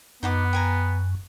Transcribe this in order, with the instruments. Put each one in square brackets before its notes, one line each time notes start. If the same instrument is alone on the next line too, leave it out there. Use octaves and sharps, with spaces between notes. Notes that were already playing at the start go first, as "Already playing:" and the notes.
[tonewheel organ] F#2 [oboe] B3 [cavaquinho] D#4 F#5 D6
[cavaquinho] G5 G#5 A#5